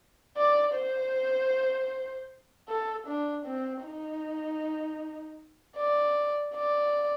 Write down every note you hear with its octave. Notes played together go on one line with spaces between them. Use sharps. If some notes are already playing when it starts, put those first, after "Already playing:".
D5
C5
A4
D4
C4
D#4
D5
D5